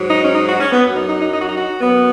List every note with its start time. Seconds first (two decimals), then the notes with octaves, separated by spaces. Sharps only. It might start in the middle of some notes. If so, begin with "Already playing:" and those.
Already playing: G#2 F#3
0.11 D#4
0.23 C#4
0.35 D#4
0.47 F#4
0.59 C#4
0.72 B3
0.84 F#2 F#3
0.96 D#4
1.08 D#4
1.20 D#4
1.33 D#4
1.40 F#4
1.48 D#4
1.57 F#4
1.81 F#2 F#3 B3